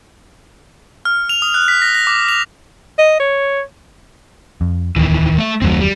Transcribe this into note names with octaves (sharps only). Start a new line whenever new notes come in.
F6
F7
D#6
F#6
B6
A#6
A#6
D6
F7
D#5
C#5
F2
D1 E2 D#3 E3
A3 E5
F#1 D#2 F#3 A3 C4
G3